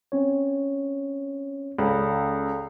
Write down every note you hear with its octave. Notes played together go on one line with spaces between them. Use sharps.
C4 C#4 C#5
C#2 A4 D5 B5